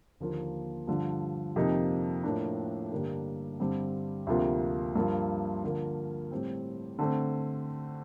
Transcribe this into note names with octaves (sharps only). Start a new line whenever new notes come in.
D#2 D3 F3 A#3 F4
G2 D3 F3
F2 C3 F3 A#3 D#4
A2 F3 A#3 D4
G2 D3 G3 A#3 D4
G2 D3 G3 C4
D2 C3 F3 A#3 F4
G2 F3 A#3 F4
D3 F3 A#3
A2 G3 C4
D3 A3 C4